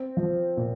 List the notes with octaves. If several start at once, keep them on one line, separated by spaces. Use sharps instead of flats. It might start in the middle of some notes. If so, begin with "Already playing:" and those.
Already playing: C4
F3
A#2